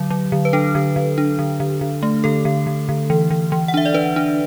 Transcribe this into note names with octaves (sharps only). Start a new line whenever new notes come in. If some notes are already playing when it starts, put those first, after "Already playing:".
Already playing: D3 F#3
F#3
D3
B4
D4 A4
D3
D3
D4
D3
D3
D3
A3
D3 A4
D3
D3
D3
E3
E3
E3
F#5
D4 E5
D5
D4 B4
D4